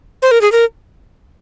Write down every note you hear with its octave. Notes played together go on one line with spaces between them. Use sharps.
C5
A#4
G#4
A#4